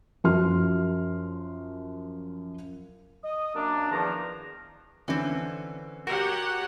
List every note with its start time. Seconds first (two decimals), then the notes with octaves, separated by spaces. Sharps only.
0.24 F#2 F3 F#4 C6 F6
3.24 D#5 D#6
3.54 F#2 A#3 D4
3.91 E2 D#3 F3 D4 A#5
5.08 D3 E3 C4 C#4
6.07 F#4 G4 A#4 C#5 F#5